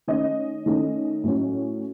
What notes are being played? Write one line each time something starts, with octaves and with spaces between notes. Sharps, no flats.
D#3 A3 C#4 D#5
D#3 A3 C#4
A2 F#3 C#4